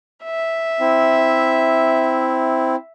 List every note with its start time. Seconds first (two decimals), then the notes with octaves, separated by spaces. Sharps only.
0.25 E5
0.80 C4 E4